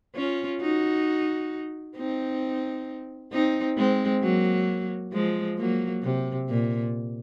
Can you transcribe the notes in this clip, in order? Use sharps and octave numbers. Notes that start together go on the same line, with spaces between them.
C#4 F4
D#4 F#4
C4 D#4
C4 D#4
G#3 C4
F#3 A#3
F3 G#3
F#3 A#3
C3
A#2